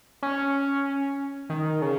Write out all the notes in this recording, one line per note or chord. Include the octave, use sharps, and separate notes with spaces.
C#4
D#3
C#3